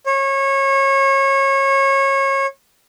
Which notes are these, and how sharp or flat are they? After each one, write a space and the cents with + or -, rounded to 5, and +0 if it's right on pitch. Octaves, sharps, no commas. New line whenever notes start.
C#5 -25